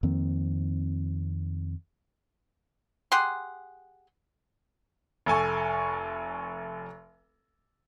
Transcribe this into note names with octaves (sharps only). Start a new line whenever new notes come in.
F2 D#3 A#3 C4
G4 G#4 F#5 C6
F1 A4 G#5 C#6